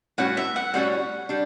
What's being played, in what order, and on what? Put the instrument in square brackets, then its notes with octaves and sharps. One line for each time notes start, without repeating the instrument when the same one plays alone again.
[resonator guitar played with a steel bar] A2 G3 C#4 F#4 [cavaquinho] F#5
[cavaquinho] E5
F#5
[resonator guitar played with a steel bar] A2 G3 C#4 F#4 [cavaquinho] F#5
[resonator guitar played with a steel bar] G3 D4